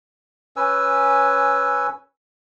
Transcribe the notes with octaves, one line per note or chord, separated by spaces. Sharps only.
C#4 B4 G#5 E6